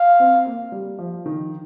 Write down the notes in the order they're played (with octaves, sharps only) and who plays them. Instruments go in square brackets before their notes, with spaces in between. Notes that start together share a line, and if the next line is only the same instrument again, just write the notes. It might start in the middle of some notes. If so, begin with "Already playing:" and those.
Already playing: [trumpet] F5
[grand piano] C4
A#3
G3
F3
D#3